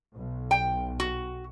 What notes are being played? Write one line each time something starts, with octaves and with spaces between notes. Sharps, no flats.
B1
G5
F#4